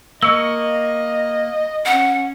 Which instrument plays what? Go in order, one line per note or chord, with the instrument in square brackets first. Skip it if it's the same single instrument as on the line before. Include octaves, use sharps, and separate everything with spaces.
[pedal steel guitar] A#3 C#6 [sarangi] D#5 [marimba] E6
[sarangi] C#4 [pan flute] F#5